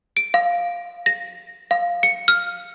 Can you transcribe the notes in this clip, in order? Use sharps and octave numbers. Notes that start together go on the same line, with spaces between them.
D7
F5
A#6
F5
C#7
F6